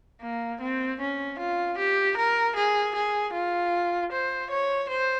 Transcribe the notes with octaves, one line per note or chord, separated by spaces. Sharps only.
A#3
C4
C#4
F4
G4
A#4
G#4
G#4
F4
C5
C#5
C5